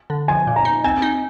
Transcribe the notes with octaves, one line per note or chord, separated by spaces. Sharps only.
D3
F3 G#5
A#2
A#5
D#4
C4 G#5
D#4